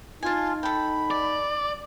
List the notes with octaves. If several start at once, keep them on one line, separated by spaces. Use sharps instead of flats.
D#4 F4 G#5 A5
A4 G5 B5
D5